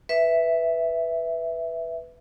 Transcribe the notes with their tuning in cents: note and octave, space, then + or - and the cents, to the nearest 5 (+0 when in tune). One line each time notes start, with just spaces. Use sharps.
B4 +0 E5 +0